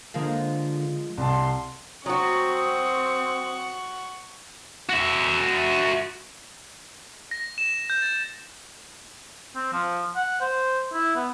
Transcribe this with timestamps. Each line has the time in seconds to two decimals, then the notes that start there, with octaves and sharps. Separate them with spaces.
0.14 D3 F3 G#3 A#3
1.17 C2 A5 C6
2.06 F#3 C4 F#4 F#5 C#6 D#6
4.90 F#4 E5
7.31 A#6
7.58 E7
7.90 G6
8.02 A6
9.55 C4
9.73 F3
10.16 F#5
10.41 C5
10.93 E4
11.16 B3